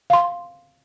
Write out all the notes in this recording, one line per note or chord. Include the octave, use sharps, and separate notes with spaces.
F5 C6